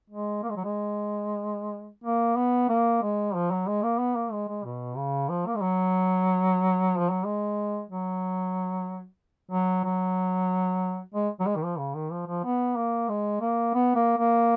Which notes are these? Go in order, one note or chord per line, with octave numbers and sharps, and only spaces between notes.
G#3
A#3
G#3
F#3
G#3
A#3
B3
A#3
G#3
F3
F#3
G#3
A#3
B3
A#3
G#3
G#3
B2
C#3
F3
A#3
G#3
F#3
F3
F#3
G#3
F#3
F#3
F#3
G#3
F#3
G#3
D#3
F3
C#3
D#3
F3
F3
B3
A#3
G#3
A#3
B3
A#3
A#3